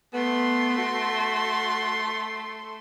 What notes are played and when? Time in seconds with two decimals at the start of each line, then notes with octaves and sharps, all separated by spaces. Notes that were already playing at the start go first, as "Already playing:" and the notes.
0.14 A3 B3 C6
0.78 F#4